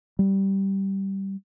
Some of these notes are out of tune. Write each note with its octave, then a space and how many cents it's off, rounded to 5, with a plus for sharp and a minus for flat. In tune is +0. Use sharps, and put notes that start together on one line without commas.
G3 -10